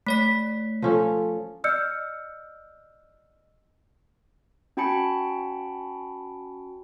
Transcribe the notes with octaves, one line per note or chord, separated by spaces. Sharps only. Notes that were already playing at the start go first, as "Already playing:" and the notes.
A3 C#5 B6
F3 C#4 A4
D5 D#5 E6 F6 G6 C#7
C#4 F#4 G5 A5 B5 C#7